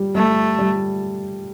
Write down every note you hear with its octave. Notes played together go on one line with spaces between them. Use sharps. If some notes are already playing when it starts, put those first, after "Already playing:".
Already playing: G3
G3 A3
G3